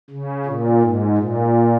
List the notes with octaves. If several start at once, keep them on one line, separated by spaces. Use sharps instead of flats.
C#3
A#2
G#2
A#2